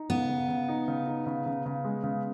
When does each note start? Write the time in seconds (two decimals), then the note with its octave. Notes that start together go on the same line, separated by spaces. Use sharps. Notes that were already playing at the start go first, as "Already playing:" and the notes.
Already playing: D#4
0.10 C#3 B3
0.29 C#3
0.48 C#3
0.69 D#4
0.88 C#3
1.06 D#4
1.26 C#3
1.46 C#3
1.66 C#3
1.84 G#3
2.04 C#3